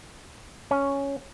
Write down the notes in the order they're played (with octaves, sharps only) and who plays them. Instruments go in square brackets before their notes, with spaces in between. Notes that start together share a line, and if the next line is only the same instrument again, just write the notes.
[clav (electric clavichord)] C#4